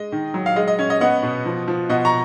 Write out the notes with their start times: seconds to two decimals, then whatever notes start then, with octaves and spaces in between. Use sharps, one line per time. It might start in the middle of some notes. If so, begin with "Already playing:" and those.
Already playing: G#3 D#5
0.12 D#3
0.34 F#3
0.46 F5
0.56 G#3 D#5
0.68 D#5
0.79 C#4 C#5
0.90 D#5
1.01 B3 D#5 F#5
1.23 B2
1.46 F3
1.68 F3
1.89 B2 D#5 F#5
2.05 A#5 C#6